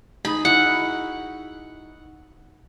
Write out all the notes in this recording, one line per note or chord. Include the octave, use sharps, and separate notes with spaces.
D#4 G#4 B5
D#4 E4 F#4 F#5